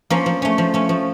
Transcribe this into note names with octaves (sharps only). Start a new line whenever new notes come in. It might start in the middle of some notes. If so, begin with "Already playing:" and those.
F3 A#3 C#4
F3
A3 C#4
F3
A3 C#4
F3